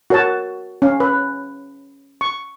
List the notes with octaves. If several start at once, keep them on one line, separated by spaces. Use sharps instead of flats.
F#4 A#4 C#5 F#5 A5
C#4 F5
B4
C#6